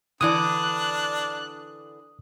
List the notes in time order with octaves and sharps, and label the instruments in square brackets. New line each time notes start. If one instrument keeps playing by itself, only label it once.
[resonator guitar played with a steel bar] D3 E3 D5 [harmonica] D4 [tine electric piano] D#6 [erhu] F#6